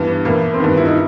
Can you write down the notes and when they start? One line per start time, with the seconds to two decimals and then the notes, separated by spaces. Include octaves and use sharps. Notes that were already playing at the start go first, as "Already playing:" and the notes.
Already playing: G2 E3 B3
0.25 A2 E3 A#3
0.54 C4
0.60 G2 D#3 B3
0.77 E4
0.85 D#4